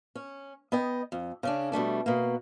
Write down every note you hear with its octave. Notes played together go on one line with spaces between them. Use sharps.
C#4
B3 D#5 G5
F2
C#3 C#4 D4
B2 G3 A3 D4
B2 A#3